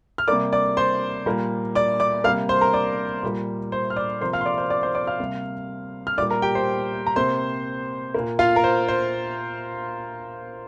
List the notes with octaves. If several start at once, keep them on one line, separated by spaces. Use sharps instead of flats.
F6
C3 G3 A#3 D5 D6
D5 D6
C5 C6
A#2 G3 A#3
D5 D6
D5 D6
C3 G3 A#3 F5 F6
C5 C6
A#4 A#5
D5 D6
A#2 G3 A#3
C5 C6
F6
D5 D6
C3 F3 A#3 C5 C6
F5 F6
C6
D5 D6
C5 C6
D5 D6
C5 C6
D5 D6
F5 F6
C3 G3 A#3
F6
A#2 G3 A#3 D5 D6
A#4 A#5
G4 G5
C5 C6
A#5
C3 A#3 C5 C6
A#2 A#3
F4 F5
A#4
C5
C5